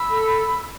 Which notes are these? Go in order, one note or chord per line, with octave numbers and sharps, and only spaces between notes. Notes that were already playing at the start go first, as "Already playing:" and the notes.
Already playing: B5 E6
A4